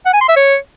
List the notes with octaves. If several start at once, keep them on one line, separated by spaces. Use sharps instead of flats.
F#5
G#5
C6
E5
C#5